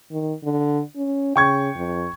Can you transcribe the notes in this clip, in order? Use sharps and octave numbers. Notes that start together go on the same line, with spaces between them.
D#3
D3
C#4
C#3 G5 C#6 G#6
F2